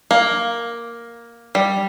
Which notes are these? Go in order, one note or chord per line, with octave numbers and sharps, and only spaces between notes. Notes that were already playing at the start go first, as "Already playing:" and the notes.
A#3
G3